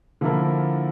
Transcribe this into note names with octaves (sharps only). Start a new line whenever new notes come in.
D3 F3 A#3 E4 A#4